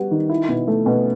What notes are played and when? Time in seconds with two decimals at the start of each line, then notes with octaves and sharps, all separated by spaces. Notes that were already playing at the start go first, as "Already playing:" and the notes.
Already playing: G3 B3 F#4
0.11 D#3
0.30 E4
0.49 B2
0.68 A3
0.86 B2